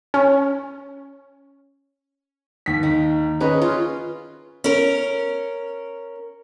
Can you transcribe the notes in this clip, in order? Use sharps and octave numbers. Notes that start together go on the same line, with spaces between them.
C#4
D#2 B6
D#3
C#4 G#4 B4 D#5
F4
C#4 A#4